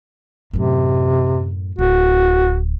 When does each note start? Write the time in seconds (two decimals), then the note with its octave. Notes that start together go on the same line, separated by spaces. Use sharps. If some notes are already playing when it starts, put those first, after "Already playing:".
0.53 F#2 A2 C3
1.79 D1 F#4